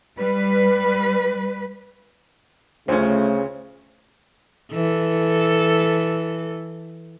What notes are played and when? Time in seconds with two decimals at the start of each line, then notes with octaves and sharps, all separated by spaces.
0.19 G3 B4
2.88 D2 C#3 A3 C#4 F4 C5
4.73 E3 A4